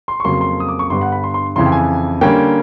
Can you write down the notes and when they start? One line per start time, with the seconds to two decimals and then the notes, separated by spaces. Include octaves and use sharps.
0.08 C6
0.20 C#6
0.25 F2 C#3 F#3 A#3 C6
0.41 C6
0.60 D#6
0.69 D6
0.79 C#6
0.90 G2 D3 G3 B3 C6
1.01 F#5
1.12 B5
1.24 C6
1.34 C6
1.56 F2 C#3 E3 C6
1.66 G5
1.72 G#5
2.21 D3 G3 A#3 C#4 G5